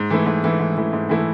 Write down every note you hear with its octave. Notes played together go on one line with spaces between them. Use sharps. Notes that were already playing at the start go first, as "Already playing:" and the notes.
Already playing: G#2
E3 A3 E4
G#2
E3 A3 E4
G#2
E3 A3 E4
G#2
E3 A3 E4